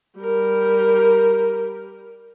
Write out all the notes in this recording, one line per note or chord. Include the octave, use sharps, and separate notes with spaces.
G3 A#4